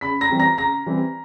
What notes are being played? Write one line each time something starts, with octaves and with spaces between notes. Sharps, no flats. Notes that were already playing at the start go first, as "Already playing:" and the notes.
C#3 B5 B6
A#5 A#6
E3 G3 C4
A#5 A#6
C#3 A#5 A#6
E3 G3 C4